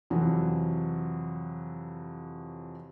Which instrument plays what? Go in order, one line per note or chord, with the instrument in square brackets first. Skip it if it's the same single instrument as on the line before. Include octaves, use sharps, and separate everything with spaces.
[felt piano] F2 C3 E3 F#3